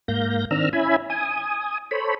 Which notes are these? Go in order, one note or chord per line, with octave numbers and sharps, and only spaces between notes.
G#2 A#3 F5 G6 A#6
D#3 C4 D4 A#5 E6 F6
C#4 E4 E5 G#5 B5
G#5 D#6
A4 C5 C#5 B5